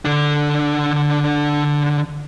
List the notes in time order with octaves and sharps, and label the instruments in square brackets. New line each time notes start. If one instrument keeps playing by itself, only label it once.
[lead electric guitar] D3 D4